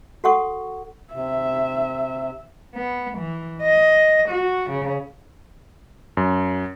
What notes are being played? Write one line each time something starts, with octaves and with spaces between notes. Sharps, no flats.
F#4 A4 F#5 C#6 D#6
C3 E5
B3
E3
D#5
F#4
C#3
F#2